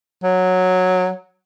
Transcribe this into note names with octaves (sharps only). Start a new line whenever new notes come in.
F#3